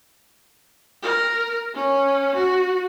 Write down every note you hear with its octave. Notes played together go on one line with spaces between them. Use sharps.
A#4
C#4
F#4